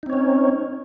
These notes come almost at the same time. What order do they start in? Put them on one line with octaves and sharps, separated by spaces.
D#4 C4 C#5 C#4